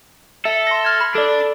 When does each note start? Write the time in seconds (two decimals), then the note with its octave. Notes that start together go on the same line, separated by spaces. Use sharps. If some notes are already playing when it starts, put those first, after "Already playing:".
0.45 A4 E5
0.67 C6 A#6
0.85 F6 G#6
1.01 B5
1.15 D4 A4 D5